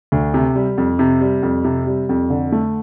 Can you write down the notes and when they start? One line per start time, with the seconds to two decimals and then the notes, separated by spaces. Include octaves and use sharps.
0.12 D2
0.34 C3
0.56 G3
0.78 F2
0.99 C3
1.21 G3
1.43 F2
1.64 C3
1.87 G3
2.09 F2
2.30 D3
2.52 A3